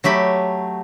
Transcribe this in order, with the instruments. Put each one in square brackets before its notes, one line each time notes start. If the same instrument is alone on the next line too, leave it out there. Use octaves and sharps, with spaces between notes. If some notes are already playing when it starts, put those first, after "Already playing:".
[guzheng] F#3 A3 G4 B5